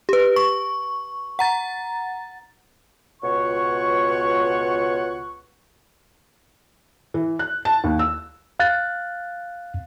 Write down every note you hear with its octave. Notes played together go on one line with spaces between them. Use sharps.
G4 B4
C#6
F#5 A#5 A6
C#2 B2 F4 C#5 F#5 C#6
E3
F#6
A5
D#2
E6
F5 F#6 A6